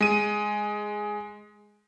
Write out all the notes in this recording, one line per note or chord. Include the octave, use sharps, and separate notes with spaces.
G#3 D#7